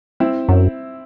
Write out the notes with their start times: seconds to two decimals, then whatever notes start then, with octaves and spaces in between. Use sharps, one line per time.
0.20 C4 E4
0.49 F#2